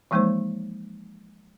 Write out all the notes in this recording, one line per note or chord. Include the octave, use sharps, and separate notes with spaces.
E3 F3 G#3 A#3 D#4 C5